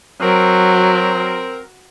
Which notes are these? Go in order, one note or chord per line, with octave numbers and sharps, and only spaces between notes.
F#3 C4 A#4